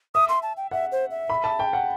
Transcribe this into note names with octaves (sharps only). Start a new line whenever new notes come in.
E5 D#6
C6
A5
G5
E5 F#5
C5
E5
B5
A5
G5
F#5